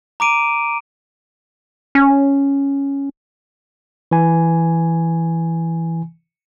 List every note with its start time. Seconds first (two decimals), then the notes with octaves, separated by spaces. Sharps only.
0.20 A#5 D6 D7 D#7
1.95 C#4
4.11 E3 G#5